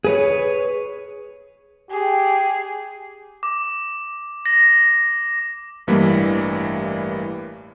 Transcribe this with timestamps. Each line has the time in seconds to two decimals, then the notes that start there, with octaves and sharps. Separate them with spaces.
0.05 G#4 B4 C#5
1.91 G4 G#4
3.43 D6
4.46 A#6
5.87 A1 G2 E3 G3 A#3 B6